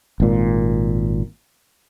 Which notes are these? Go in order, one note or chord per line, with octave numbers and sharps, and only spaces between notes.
G#1 A#2